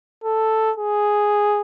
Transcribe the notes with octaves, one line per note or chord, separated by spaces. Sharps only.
A4
G#4